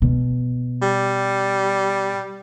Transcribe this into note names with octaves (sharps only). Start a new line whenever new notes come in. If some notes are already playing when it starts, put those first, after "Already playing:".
B2
G3